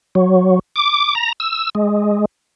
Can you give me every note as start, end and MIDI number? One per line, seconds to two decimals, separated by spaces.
0.15 0.59 54
0.76 1.15 86
1.15 1.32 82
1.40 1.70 88
1.75 2.25 56